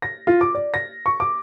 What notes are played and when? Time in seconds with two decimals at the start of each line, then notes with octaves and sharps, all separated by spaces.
0.02 A#6
0.27 F4
0.41 D6
0.55 D5
0.74 A#6
1.06 C#6
1.20 D6